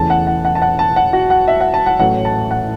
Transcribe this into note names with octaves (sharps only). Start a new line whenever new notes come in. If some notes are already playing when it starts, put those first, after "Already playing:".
Already playing: E2 C#3 E3 A3 A5
F#5
F#5
F#5
A5
F#5
A5
F#5
F#4
F#5
E5
F#5
A5
F#5
A1 A2 F#3 A3 F#5
A5
F#5